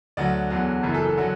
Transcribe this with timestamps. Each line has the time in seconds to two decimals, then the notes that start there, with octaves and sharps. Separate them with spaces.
0.17 D2 D3 F#3 D5 F#5
0.50 E2 D3 F#3
0.83 F#1 F#2 E3
0.94 A4
1.05 A4
1.17 D3 F#3